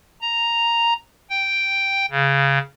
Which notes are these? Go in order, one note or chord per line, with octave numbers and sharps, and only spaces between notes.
A#5
G5
C#3